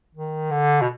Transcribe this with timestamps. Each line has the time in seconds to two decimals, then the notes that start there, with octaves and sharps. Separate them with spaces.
0.15 D#3
0.51 D3
0.81 B2